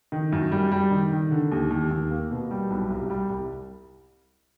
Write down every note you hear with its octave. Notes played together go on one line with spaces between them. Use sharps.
D#3
F#2
G3
G3
D#3
D#3
D3
D#2
D#2
D#2
A#3
B2
G3
B1
C2
G3
C2